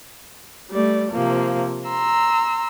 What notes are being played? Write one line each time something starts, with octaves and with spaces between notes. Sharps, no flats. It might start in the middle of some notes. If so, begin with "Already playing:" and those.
G3 A3 D5
C3 F3 A#3
A#5 C6 E6